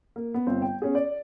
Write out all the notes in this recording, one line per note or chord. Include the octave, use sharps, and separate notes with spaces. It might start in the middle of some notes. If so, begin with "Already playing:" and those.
A#3
B3
G1 C4
G5
B3 C#4 G#4
D5